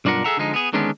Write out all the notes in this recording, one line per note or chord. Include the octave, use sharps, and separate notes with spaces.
B1 G2 D4 F4 A#4 F#5
G#4 A4 B4 E5 F#5 A#5
D3 F3 G#3 D#4
B3 G#4
D3 D#3 G#3 B3 C#4 D4